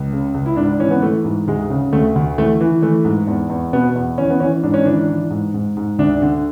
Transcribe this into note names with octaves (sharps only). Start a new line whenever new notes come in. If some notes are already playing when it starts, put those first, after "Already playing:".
Already playing: C#2
C#3
C#2
E4
G#2 D4
E3 C#4
B3
E3 A3
G#2
D2 G#3
C#3
D2 A3
D2
E3 A3
E3
E3 A3
G#2
E2
E2
B2 B3
E2
E3 C#4
B3
E3 C#4
G#2 D4
C#4
E3 D4
E3
G#2
G#2
G#2
D2 D4
D3